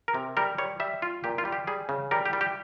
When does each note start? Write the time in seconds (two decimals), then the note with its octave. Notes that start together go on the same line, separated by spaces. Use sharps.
0.08 A#4
0.14 C3
0.37 G3 A#4
0.58 G3 C#5
0.80 G3 E5
1.02 F4
1.24 A#2 G4
1.38 F4
1.45 G3
1.52 G4
1.67 G3 G#4
1.89 C#3
2.11 G3 A#4
2.26 G4
2.33 G3
2.41 G4